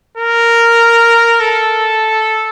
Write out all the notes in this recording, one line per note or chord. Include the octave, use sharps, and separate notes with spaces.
A#4
A4